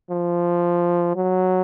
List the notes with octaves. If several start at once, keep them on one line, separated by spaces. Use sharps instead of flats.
F3
F#3